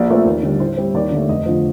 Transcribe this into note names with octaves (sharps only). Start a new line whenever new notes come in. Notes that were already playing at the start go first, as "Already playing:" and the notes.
Already playing: A#1 D5
A#2 A3 C4
D#2
D3 G3 D4
A2 C5
G3 C4
D#2 D5
D3 A3
F1 D#5
D3 F3